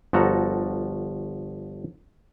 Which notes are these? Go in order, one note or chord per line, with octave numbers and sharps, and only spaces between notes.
G1 F3 F#4 A4 A#5